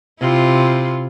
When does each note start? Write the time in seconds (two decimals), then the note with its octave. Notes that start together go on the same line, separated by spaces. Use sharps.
0.20 C3 E4 F4